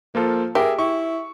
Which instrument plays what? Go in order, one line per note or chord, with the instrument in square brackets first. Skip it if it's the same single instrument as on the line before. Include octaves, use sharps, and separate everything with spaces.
[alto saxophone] F3 [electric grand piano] A#3 F4 A4
[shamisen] G4 [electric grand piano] G#4 E5 [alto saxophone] A#4
[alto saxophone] E4 [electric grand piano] C#6